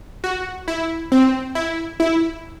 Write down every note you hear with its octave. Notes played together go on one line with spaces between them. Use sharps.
F#4
E4
C4
E4
E4